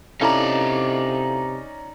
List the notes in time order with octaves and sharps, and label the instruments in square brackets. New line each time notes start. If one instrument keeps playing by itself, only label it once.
[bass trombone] C3 [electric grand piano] C#4 A#5 [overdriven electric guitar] D#4 D5 [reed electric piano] E4 A4 F5